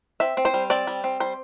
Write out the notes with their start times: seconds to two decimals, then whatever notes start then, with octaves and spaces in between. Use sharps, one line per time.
0.20 C4 E5
0.37 C4
0.45 C5
0.54 G3
0.70 C4 D5
0.87 G3
1.04 C4
1.20 G3 C5